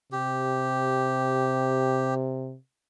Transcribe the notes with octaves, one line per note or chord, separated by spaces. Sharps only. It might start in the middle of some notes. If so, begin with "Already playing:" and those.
C3 G4